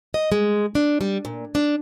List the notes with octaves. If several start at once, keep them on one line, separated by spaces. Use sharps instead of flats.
D#5
G#3
D4
G3
A#2
D4